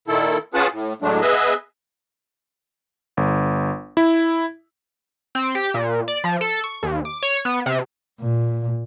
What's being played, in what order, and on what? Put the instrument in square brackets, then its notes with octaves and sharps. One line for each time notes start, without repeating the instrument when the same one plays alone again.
[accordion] A#2 D#3 E4 A4
C#4 F4 G#4 B4 F#5 A5
A2
A2 F#3 G#3 A3 D4
B3 G#4 B4 D#5 E5
[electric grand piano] G1
E4
[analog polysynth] C4
G4
A#2
D5
F3
A4
C#6
D#2
D6
C#5
B3
C3
[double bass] A#2